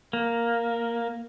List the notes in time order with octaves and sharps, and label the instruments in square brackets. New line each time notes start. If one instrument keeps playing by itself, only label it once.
[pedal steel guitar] A#3